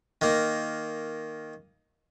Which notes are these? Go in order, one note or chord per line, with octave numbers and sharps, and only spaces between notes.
D#3 A#3